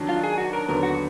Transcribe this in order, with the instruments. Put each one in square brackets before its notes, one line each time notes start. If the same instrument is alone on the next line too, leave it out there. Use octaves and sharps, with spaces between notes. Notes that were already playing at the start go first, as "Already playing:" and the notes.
Already playing: [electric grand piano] D#3 F#3 D4
[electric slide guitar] F4
G#4
F#4
A#4
[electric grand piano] D#2 D3 F#3 B3 [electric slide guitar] A#4
[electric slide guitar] F#4